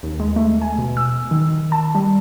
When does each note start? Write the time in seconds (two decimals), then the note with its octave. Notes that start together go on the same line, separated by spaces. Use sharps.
0.03 D#2
0.20 G#3
0.36 A3
0.62 G#5
0.78 B2
0.97 E6
1.31 D#3
1.72 A5
1.95 G3